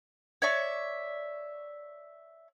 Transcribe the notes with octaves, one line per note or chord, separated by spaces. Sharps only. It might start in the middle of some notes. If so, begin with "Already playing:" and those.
C#5 D5 E5 C#6